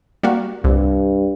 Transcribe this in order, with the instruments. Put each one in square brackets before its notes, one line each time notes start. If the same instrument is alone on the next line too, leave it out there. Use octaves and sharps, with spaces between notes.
[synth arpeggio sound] G3 A#3 F#4
[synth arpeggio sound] C2 [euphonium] G2